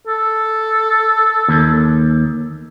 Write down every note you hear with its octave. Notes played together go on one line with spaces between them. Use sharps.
A4
D#2